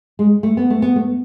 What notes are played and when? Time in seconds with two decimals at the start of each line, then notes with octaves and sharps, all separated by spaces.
0.19 G#3
0.43 A3
0.57 B3
0.70 A3
0.82 B3
0.96 A3